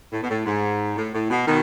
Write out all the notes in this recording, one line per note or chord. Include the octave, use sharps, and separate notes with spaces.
A2
B2
A2
G#2
A2
A2
B2
B2 D#3